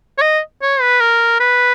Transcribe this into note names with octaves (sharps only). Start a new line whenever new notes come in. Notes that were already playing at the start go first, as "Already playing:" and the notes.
C#5
D#5
C#5
B4
A#4
B4